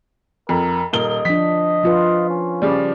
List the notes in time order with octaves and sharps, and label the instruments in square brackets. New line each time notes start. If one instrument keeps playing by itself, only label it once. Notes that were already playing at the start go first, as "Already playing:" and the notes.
[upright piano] F2 [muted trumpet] A#4
[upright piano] D#1 A#4 G7 [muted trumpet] D#5
[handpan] F3 D4 [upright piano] B6
[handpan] F3 F4 B4
[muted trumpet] C#4
[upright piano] C#3 F3 G3 [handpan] D5